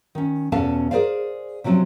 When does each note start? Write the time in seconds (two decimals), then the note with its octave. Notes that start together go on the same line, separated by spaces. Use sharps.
0.15 D#3 C#4
0.52 E2 B2 C#4 A4 F5 A5
0.91 G#4 A#4 C5 D5 F5
1.64 C3 F3 F#3 C4 C#4